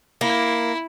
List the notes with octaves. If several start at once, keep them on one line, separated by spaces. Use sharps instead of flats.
A#3 E4